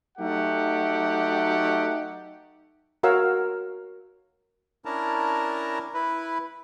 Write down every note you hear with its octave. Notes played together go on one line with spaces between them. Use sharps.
F#3 A3 D#4 G4 F#5
F#4 A#4 C#5 F5 F#5 E6
C#4 D4 E4 A#4 A5 A#5
E4 B4